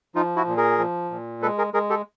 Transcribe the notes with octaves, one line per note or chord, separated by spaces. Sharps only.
F3 D#4 F4
E4 F#4
A#2
G#4 A#4
F3
A#2
G#3 A4 B4
G#4 A#4
G#3 G#4 A#4
G4 A4